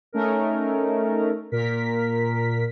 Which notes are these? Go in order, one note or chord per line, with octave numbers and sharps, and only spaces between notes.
A3 C#4 D#4 A#4
A#2 A#4 B6